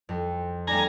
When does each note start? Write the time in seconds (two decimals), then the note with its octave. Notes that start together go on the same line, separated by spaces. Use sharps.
0.09 F2
0.67 G3 A3 D4 G#5 A#5